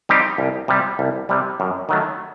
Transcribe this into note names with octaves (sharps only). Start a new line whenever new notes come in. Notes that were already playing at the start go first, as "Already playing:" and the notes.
G3 C4 D#4 G4
C2
C3 G3
C2
C3 G3
F#2
D#3 F#3 A3